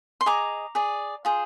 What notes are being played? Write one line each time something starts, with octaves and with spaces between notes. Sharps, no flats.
C6
G#4 D#5 A#5 D6
G#4 D5
F4 G#4 C5